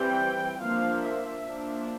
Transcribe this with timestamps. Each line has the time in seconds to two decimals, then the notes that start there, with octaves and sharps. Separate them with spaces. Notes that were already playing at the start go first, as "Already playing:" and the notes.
Already playing: E3 G3 C4 G5
0.59 F3 A#3 D4 F5
1.03 E5
1.46 F3 A#3 D4